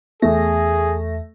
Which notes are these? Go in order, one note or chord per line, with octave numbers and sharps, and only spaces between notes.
E2 A3 G#4 A#6